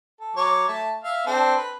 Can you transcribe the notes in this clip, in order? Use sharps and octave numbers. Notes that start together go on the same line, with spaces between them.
A4
F#3 C#5 D6
A3 A5
E5 F5
C4 D4 A4
B4